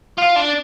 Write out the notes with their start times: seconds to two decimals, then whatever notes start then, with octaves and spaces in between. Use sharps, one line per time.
0.18 F4
0.36 D4